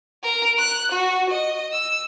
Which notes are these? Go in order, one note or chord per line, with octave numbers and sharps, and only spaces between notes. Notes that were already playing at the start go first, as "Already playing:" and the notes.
A#4
F#6
F#4
D#5
E6